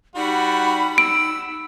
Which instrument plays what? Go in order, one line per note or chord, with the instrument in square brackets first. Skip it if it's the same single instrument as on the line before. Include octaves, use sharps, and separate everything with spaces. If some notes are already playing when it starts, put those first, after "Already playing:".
[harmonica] G3 F#4 [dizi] D#4 [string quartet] F#5 B5
[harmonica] E6 [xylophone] D7